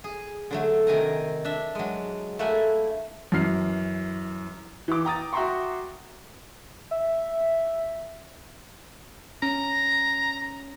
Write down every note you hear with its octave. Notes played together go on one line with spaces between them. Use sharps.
G#4
D3 F#3 A3
C3 D#3 G#5 A#5
D4 E5
F#3 G#3
A3 A#3 E4 E5 F#5 G#5
F#2 E3 F6 C7
E3 D6
G5 A#5 D#6 A6
F#4 E5 G5 A#5 C6 C#6
E5
C#4 A#5